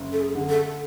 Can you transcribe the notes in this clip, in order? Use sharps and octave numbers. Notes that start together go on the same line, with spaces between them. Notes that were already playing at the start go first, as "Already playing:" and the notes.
Already playing: F#1
A4
G#4
D3
A4